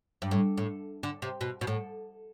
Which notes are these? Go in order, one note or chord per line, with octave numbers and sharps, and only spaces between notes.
G2
A2
A2
D3
C3
B2
B2
A2